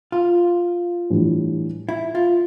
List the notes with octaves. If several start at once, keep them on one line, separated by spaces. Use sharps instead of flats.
F4
A2 E3 G3 D4
E4
F4